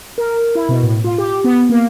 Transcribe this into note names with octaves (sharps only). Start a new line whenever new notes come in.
A#4
E4
B2
A2
F4
G4
B3
A#3